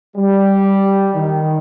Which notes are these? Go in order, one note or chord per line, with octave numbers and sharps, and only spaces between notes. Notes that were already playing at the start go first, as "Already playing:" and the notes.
G3
D#3